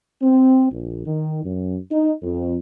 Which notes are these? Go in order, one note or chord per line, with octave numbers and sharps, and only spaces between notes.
C4
A#1
D#3
F#2
D#4
F2